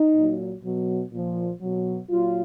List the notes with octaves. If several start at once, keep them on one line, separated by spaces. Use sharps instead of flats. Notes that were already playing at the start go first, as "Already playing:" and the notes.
Already playing: D#4
A#2 F#3
B2 F#3
A#2 F3
B2 F#3
A#2 F#3 F4